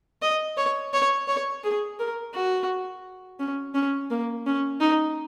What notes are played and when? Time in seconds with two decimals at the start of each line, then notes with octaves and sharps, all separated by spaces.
0.22 D#5
0.57 C#5
0.93 C#5
1.28 C#5
1.64 G#4
1.99 A#4
2.34 F#4
3.39 C#4
3.75 C#4
4.11 A#3
4.46 C#4
4.81 D#4